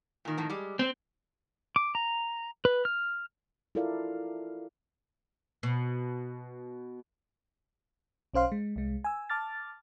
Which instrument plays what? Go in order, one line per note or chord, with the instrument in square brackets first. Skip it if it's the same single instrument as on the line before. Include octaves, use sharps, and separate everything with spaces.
[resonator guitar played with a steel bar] A#2 D#3
F2 A2 D#3
G3 G#3
[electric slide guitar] C4
[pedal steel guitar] D6
A#5
B4
F6
[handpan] E4 F4 A4 A#4 D5 F5
[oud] B2
[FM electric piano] B1 C#4 C5 F5 C6
G#3
C2 G#3
G#5 E6
A5 D6 F6 A6